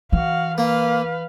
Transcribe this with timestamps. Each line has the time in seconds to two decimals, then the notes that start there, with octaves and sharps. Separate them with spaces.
0.12 E3 F#4 F5
0.58 A#3 B4 F5